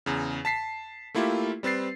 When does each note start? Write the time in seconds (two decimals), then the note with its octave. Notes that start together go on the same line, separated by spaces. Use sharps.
0.06 E2 C#3
0.45 A5 B6 C7
1.14 A3 A#3 E4 F4 G4
1.63 G3 C4 B4 A6 C7